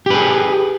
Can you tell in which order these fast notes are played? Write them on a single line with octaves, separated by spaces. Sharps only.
G4 B4 G#4